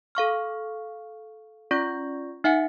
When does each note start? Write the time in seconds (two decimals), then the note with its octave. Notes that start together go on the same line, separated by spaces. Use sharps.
0.15 A4 F5 C#6 F6
1.71 C#4 F4 D5 C#6 G6 A#6
2.44 D#4 E5 F#5 G#5 C#7